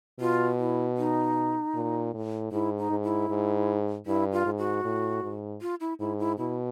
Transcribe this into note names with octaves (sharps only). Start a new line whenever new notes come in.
B2 F4
E4
D#4
A#2
A2
G#2 E4
D#4
G#2
E4
G#2
G2 E4
F4
G#2
F#4
A2
G#2
F4
E4
G#2 E4
E4
B2 E4